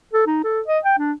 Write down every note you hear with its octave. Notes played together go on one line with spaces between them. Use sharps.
A4
D#4
A4
D#5
G5
D4